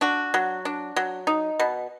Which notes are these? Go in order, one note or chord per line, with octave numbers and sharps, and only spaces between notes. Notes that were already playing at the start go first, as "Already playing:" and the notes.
D4 F#4
F#3
D4
F#3
D#4
B2